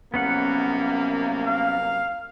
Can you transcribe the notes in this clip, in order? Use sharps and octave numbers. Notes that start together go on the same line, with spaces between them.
C2 F#2 A#3 B3 C#4 F#5
F5